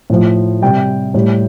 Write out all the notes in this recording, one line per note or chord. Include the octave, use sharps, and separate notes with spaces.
A2 F3
C3 G3 G5
A2 G3